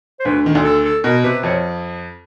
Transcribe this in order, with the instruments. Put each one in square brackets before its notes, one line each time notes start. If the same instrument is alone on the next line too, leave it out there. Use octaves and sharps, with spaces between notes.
[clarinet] C5
[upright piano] D2 D3 [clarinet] B4
[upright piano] D#3
D2 D3
[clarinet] A4
A4
[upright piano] B2 [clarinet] A#4
[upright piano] C3 [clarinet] B4
[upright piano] F2 F3 [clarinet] C#5